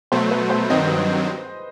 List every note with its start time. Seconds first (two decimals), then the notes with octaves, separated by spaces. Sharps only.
0.12 B2 F#3 A3 C5
0.31 B4
0.50 C5
0.70 G2 D#3 F#3 C4 D#5